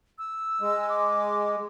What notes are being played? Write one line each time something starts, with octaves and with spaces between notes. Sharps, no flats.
E6
G#3
D6